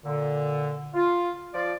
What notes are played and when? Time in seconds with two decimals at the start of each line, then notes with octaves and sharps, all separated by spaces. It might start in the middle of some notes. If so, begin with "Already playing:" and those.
0.05 A#2 D3
0.94 F4
1.54 F3 F4 D5